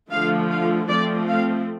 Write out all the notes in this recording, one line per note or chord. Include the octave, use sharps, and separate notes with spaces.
D3 F3 A3 F5
F5
F3 A3 C4 D5
F5